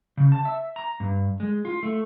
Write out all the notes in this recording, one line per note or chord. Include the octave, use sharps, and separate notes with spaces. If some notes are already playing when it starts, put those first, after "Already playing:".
C#3
A5
E5
A#5
G2
G#3
F4
A3